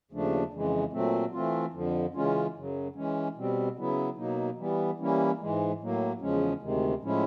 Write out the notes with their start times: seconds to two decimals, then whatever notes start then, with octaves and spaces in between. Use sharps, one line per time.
0.11 D#2 C#3 F3 A3 D4
0.52 F2 C#3 E3 G#3
0.93 A#2 F#3 A3 C4
1.33 E3 A3 C4 F4
1.74 F2 D3 F3
2.15 C#3 E3 G#3 C#4 F4
2.55 F#2 C#3 F#3
2.96 E3 G#3 C#4
3.37 B2 G3 C4
3.77 C#3 F#3 B3 E4
4.17 B2 F#3 A#3 D#4
4.58 E3 G3 B3
4.99 E3 G3 A#3 C#4 E4
5.40 G#2 E3 G#3
5.80 A2 F#3 A#3
6.21 E2 C#3 F3 G#3 C#4
6.62 D2 C3 D#3 G#3
7.02 A2 F3 G#3 C#4 E4